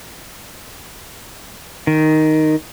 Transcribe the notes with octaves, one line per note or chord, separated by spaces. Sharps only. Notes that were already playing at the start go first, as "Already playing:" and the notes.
D#3